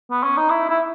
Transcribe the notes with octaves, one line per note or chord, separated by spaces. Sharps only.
B3
C#4
D#4
E4
E4